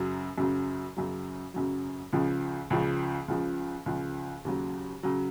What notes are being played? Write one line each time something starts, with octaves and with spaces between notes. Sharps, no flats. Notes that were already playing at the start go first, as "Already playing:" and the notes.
Already playing: F#2 C#3 F#3
F#2 C#3 F#3
F#2 C#3 F#3
F#2 C#3 F#3
C#2 C#3 F3
C#2 C#3 F3
C#2 C#3 F3
C#2 C#3 F3
D#2 C#3 F#3
C#3 F#3